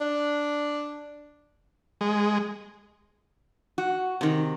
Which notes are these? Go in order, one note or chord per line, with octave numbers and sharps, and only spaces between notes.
D4
G#3
F#4
C3 D#3